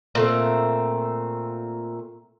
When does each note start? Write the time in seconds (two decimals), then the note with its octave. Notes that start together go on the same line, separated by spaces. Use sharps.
0.15 A#2 A3 C4